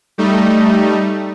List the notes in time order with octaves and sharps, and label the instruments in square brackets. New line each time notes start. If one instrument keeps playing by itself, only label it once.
[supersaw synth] G3 A3 D#4